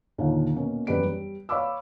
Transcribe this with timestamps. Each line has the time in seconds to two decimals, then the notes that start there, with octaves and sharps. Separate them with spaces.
0.18 D#2 A#2 D3 D#3
0.55 B2 A#3 C#4
0.87 E1 F#2 G4 B4 D5 D7
1.04 G3
1.49 C#5 F5 B5 D6 E6